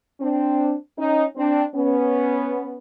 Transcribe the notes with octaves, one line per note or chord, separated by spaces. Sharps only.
C4 D4
C#4 D#4
C4 D4
B3 C#4